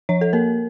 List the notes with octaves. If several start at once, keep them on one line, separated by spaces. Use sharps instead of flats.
F3 C#5
A4
A#3 A#4